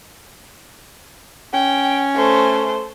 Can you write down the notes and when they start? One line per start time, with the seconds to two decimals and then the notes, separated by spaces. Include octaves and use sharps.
1.54 C#4 G5
2.15 A3 C5